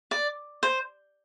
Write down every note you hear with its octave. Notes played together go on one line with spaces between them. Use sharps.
D5
C5